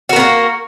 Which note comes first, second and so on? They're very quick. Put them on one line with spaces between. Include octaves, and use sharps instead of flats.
F#4 A#4 B3 A#3